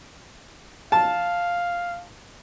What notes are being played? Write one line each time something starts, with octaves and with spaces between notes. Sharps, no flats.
F5 A5